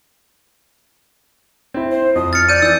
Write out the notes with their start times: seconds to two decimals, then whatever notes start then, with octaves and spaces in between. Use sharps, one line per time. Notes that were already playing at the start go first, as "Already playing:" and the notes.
1.74 C4 E4
1.91 C5
2.16 F2 D#6
2.33 F6 A6 C#7
2.49 D5 E6 G6 D#7
2.62 E3 E6 G6